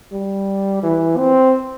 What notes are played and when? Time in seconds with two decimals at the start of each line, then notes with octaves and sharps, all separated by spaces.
0.12 G3
0.83 E3
1.17 C4